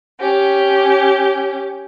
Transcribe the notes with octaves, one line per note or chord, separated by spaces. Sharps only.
C#4 G4